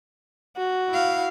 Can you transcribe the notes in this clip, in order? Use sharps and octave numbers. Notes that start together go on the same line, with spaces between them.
F#4
E4 F5